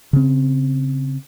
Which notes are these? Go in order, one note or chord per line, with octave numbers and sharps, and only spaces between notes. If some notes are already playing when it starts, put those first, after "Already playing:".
C#3 C4